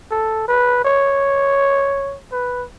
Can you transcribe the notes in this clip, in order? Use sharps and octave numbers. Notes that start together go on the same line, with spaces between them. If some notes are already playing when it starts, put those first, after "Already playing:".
A4
B4
C#5
B4